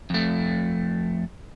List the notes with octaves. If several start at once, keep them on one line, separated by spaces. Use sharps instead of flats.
F2 A3